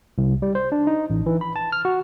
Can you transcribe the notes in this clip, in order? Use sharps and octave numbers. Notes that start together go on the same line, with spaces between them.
C2
G3
C5
D4
D#4
A1
E3
B5
A5
F6
F#4